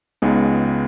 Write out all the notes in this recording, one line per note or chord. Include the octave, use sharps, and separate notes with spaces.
C#2 C#3 G#3 B3 D#4